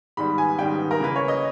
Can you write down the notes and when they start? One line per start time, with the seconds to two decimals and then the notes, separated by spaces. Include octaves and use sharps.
0.17 G#2 D#3 G3 B3 B5
0.38 G#5
0.59 G#2 D#3 G3 B3 G5
0.91 A#4
1.00 C#3 E3 A#3 B4
1.16 C#5
1.28 D#5